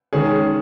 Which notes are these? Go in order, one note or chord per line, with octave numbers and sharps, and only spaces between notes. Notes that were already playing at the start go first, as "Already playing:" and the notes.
D#3 G#3 C#4 G#4